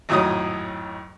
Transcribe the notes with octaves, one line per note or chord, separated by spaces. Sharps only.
G#1 F2 A2 F#3 D#4 D#6